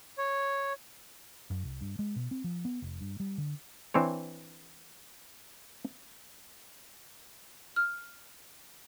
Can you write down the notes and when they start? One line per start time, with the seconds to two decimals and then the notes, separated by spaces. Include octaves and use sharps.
0.18 C#5
1.50 F#2
1.64 C2
1.81 G2
1.99 G#3
2.16 B2
2.31 C4
2.44 F3
2.65 B3
2.82 F1
3.01 G2
3.20 G3
3.38 D3
3.94 E3 C4 D4 C#5
7.76 F6